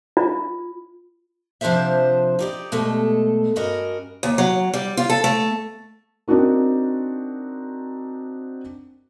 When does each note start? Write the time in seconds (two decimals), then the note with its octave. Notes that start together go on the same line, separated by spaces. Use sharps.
0.17 F4
1.61 C3 F3 D4 F4 C5 E5
2.39 D#4 G4 D5
2.72 B2 G#3 A3 A4
3.56 G2 C#4 F#4 A#4 D#5
4.23 D#2
4.38 F#3
4.73 G3
4.97 F4
5.10 A4
5.24 A3
6.28 C4 D4 D#4 F#4 A#4